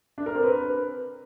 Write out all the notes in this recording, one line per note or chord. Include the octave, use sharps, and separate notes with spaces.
D4
A#4
C4
B4